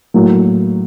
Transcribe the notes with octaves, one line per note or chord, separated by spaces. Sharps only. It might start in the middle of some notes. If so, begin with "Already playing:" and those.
A2 F#3 A#3